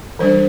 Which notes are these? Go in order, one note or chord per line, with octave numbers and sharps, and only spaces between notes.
E3 G3 D4 C5